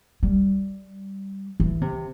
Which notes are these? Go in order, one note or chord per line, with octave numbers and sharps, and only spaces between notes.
G3
E3
C3